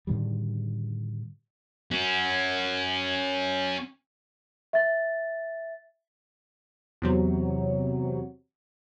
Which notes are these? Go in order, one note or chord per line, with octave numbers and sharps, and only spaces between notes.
A2 D3 D#3 G3
C#4 F#4
E5 A6
E2 C3 F#3